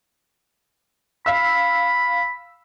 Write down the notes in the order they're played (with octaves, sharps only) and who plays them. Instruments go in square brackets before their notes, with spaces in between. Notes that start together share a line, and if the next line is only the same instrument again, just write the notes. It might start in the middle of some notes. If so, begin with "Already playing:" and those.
[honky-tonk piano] F5 E6 [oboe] B5